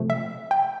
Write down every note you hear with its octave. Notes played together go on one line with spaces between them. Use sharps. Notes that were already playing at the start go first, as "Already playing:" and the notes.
Already playing: C3 F3 A3
E5
G5